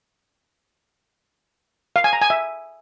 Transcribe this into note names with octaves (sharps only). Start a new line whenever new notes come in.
F5
G#5
A#5
G#5
E5